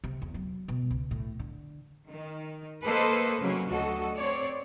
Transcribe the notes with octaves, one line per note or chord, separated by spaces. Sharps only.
C3
E2
F#3
B2
C#2
A2
D3
D#3
A#3 A4 B4 C5 D#5
C#3 F#3 A#3 C4 C#4
D2 F#3 F#4 A4 D#5
C4 C#5 D5